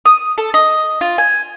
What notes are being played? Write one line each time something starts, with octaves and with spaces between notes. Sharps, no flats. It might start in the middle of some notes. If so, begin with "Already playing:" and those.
D#6
A4
D#5
F4
G#5